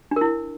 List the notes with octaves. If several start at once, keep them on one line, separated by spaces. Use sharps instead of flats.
D4 E4 A#4